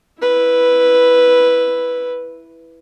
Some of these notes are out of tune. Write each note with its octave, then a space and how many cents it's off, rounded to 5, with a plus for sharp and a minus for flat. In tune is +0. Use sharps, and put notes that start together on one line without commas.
E4 +0 B4 +0